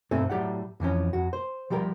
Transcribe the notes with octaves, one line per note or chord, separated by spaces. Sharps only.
B1 G2 A3 C4 A4 G#5
A2 F#3 G4 D5 F#5
F2 E3 F3 C#4
F2 F#4
C5
F3 G3 G4 A4 A#4